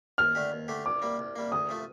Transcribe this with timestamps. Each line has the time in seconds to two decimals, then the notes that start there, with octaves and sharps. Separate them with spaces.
0.18 D#2 F6
0.35 D3 A3 D4 G4
0.52 D#2
0.68 D3 A3 D4 G4
0.85 C2 D6
1.02 C3 G3 A#3
1.19 C2
1.36 C3 G3 A#3
1.52 D2 D#6
1.69 C3 F3 A3